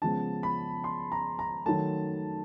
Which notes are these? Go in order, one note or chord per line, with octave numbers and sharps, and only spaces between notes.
C#3 F3 G#3 B3 A5
B5
C6
A#5
A#5
D#3 F#3 A3 A5